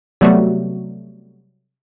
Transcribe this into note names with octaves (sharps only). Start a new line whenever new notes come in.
C3 F#3 G3 A3 B3 F#4